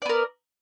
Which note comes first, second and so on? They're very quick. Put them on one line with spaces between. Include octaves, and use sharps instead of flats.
D5 B3 A#4